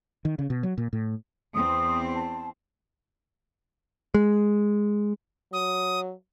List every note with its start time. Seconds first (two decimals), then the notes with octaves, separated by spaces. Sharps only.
0.25 D#3
0.39 C#3
0.50 B2
0.63 F#3
0.78 A#2
0.93 A2
1.54 E2 C4 D#6
2.15 A5
4.14 G#3
5.53 F#3 D#6